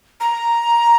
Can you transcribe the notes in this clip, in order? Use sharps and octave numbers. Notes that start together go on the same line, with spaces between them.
A#5